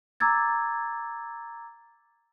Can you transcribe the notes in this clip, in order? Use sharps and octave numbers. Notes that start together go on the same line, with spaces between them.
A#5 D6 E6 G#6 A6